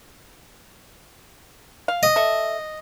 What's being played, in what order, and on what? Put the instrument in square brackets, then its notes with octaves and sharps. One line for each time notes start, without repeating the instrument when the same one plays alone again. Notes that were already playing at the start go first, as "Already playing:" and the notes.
[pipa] F5
[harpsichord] D#5
[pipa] A4 E5